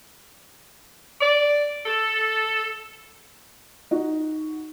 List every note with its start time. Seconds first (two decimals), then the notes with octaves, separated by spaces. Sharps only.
1.21 D5
1.86 A4
3.91 D#4 F#4